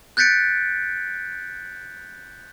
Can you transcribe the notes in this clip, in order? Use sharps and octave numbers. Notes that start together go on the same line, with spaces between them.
F#6 G6 A6 B6 C#7 D7